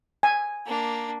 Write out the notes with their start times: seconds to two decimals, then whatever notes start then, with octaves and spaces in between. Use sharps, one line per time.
0.23 G#5
0.65 A#3 D4